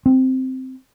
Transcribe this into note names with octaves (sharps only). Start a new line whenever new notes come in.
C4